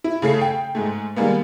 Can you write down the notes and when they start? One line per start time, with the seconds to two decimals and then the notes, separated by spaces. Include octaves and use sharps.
0.04 E4
0.22 C#3 A3 A4 C7
0.41 G5
0.75 G#2 G#3 A3
1.16 D#3 G3 G#3 A#3 B3